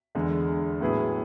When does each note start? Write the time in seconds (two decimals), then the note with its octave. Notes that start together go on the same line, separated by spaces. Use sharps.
0.15 E2 D3 G#3
0.81 A2 F#3 B3 E4 G#4